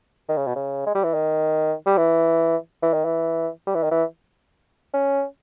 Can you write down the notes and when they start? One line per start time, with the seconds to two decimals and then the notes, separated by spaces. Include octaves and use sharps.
0.29 D#3
0.38 C#3
0.47 B2
0.56 C#3
0.86 G#3
0.95 G3
1.04 E3
1.14 D#3
1.86 G3
1.98 E3
2.83 E3
2.93 D#3
3.05 E3
3.67 G3
3.75 E3
3.83 D#3
3.92 E3
4.94 C#4